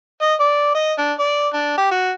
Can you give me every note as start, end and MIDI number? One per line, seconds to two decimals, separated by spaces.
0.21 0.34 75
0.40 0.74 74
0.74 0.93 75
0.98 1.13 62
1.19 1.48 74
1.53 1.75 62
1.78 1.88 67
1.91 2.11 66